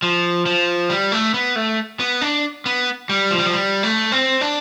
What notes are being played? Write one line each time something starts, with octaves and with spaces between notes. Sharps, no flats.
F3
F3
G3
A3
B3
A3
B3
D4
B3
G3
F3
G3
F3
G3
A3
C4
D4